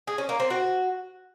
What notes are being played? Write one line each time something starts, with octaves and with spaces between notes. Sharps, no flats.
G#4
C#4
A#3
C4
F#4